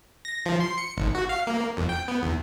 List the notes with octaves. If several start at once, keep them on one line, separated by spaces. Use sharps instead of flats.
A#6
F3
C6
C#7
G#1
F#4
F5
A#3
F2
G5
B3
E2